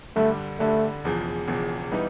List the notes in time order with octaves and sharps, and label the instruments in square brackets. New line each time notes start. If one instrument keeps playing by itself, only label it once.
[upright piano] G2 D3 G3 [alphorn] A3
[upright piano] G2 D3 G3 [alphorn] A3
[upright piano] E1 E2 C#3 F3
E1 E2 C#3 F3
E3 G3 B3 D#4